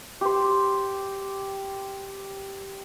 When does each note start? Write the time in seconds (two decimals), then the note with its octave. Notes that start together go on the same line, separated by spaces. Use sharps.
0.21 G4 C5